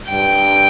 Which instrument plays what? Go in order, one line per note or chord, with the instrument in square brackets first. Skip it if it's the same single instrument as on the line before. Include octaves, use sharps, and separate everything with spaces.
[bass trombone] G2 [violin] G5